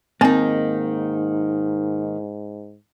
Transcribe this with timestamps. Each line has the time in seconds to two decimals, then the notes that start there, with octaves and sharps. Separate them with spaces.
0.21 G#2 D#3 A#3 C4 D#4 G#5